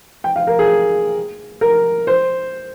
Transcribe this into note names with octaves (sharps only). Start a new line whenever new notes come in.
G5
F5
A#4
G#4
A#4
C5